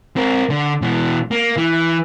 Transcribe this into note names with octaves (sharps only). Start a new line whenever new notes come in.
C4 A#4
D3
B2 E3
A#3
E3